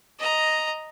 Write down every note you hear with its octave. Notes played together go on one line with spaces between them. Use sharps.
D#5 A#5